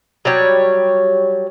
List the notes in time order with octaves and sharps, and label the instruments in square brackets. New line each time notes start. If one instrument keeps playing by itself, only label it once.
[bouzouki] F#3 G3 C#5